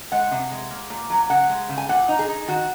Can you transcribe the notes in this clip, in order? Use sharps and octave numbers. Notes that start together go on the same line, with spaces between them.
G#3 F#5
C3
G#3
A#3
A#2
F#3
C#3 F#5
G#3
C#3
G#5
A#2 F#5
D#4
G#4
D#4
D#3 F#4